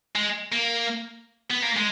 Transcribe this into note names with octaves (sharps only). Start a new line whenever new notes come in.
G#3
A#3
B3
A#3
G#3